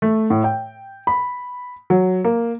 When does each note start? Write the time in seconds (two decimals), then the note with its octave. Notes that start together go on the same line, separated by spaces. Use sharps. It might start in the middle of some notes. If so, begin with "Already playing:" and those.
0.02 A3
0.30 A2
0.44 G5
1.07 B5
1.90 F#3
2.25 A#3